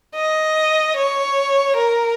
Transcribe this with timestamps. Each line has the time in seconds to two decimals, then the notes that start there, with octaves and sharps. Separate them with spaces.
0.15 D#5
0.96 C#5
1.76 A#4